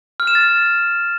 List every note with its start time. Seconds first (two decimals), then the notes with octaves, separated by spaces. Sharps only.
0.20 F6
0.27 E7
0.35 A6